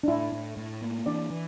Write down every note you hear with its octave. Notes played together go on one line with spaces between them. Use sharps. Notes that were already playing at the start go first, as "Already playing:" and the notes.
D4
A2 E4
A2
A2
A#3
E3 D4 D5
E3